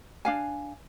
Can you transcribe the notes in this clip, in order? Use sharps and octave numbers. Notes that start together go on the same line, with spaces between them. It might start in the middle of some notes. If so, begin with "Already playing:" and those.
D4 F5 G#5